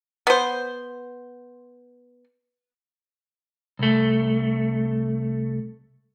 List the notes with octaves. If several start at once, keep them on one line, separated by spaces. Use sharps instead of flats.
B3 C5
C2 A3